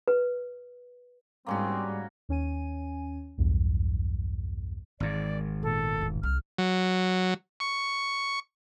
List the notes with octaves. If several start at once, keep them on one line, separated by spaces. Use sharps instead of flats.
B4
G#2 G3 A#3 C4 C#4 F#4
D#2 C#4 G#5 D#7
B1 E2 G2
G#1 G#2 E3 D5
A#2 B3 A4
E1 A1
C2 G3 F6
F#3
C#6